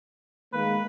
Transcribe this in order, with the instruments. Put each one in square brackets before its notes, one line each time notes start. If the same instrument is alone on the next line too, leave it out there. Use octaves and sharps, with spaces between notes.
[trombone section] D#3 G#3 A#3 [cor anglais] B4